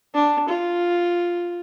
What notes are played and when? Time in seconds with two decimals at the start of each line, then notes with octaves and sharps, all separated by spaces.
0.14 D4
0.49 F4